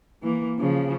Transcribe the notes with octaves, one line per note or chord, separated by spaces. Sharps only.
E3 A#3
C#3 F3